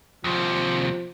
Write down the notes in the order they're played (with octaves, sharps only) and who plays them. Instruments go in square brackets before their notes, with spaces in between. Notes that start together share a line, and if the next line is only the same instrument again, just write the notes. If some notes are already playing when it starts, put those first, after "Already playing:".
[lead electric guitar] D#2 C3 [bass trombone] F3